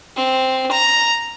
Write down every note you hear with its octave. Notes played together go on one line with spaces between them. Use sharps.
C4
A#5